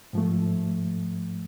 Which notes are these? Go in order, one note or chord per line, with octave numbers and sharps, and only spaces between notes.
G#2 F3 A3